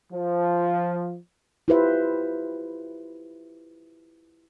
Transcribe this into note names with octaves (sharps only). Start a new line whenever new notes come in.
F3
E4 F4 G4 B4 C5 E5